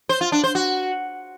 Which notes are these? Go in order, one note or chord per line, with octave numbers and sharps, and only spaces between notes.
C5
F4
D4
C5
F#4